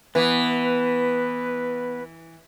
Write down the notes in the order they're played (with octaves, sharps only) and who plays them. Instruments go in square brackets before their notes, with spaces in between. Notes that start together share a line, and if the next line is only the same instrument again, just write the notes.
[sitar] E3 [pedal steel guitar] B3 [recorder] B4